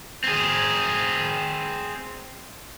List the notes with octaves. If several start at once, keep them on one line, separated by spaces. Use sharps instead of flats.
C4 G#4